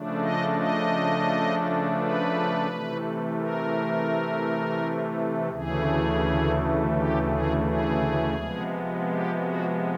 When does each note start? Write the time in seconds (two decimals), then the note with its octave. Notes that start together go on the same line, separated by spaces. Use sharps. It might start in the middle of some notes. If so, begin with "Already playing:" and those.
Already playing: C#3 F3 A3 D4
0.20 D#5
0.56 D#5
1.98 B4
2.68 C3 E3 A3
3.39 A#4
5.52 D2 C#3 E3 A3 G#4
6.93 G4
7.28 G#4
7.64 G#4
8.35 C3 F3 G#3 B3
9.06 G4
9.41 F#4